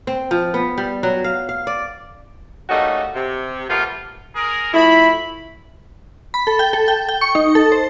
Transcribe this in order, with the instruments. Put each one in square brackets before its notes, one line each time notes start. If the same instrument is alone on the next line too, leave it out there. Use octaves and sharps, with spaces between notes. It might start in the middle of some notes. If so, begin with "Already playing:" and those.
[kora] C4
F3
B3
G3
F#3
F5
F5
D5
[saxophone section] G3 A3 A#3 C#4 D#4 F#4
C3
A#2 G3 A3 B3 F4
[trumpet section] G#4 A#4
[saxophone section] F3 A3 E4 [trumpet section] B5
[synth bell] B5
A4
G5
A4
G5
G5
C#6
D#4
A4
C5